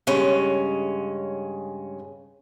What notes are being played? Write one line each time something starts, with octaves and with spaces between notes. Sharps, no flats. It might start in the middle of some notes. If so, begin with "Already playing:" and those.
G2 C#3 G#3 C#4